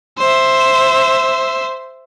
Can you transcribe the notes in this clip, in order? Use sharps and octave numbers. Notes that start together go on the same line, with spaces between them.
C5 E5